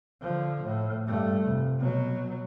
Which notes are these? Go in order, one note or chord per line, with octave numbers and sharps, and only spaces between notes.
D3 F3
A2
G2 A3
F1
B2 F#3